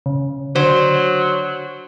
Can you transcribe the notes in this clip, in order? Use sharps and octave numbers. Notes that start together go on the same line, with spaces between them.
C#3
D3 F#3 C5